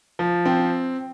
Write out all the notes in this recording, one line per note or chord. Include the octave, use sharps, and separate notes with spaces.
F3
C4